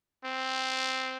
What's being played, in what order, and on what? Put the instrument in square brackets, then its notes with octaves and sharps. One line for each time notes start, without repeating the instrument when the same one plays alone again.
[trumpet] C4